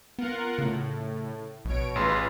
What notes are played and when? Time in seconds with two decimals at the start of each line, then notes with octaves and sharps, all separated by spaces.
0.19 B3 F4 A#4 F#5
0.58 A2 C#3
1.65 A#1 B2 C#5 D7
1.96 A1 F4 G#4 B4 C6